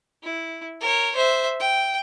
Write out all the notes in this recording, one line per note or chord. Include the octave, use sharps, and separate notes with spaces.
E4
A#4 C#5
C5 E5
G5